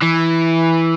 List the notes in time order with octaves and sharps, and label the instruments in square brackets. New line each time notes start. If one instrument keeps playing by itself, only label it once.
[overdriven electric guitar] E3